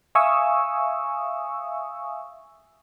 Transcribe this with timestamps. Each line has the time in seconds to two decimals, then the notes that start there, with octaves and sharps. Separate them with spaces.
0.15 E5 F5 G#5 C#6 D#6 E6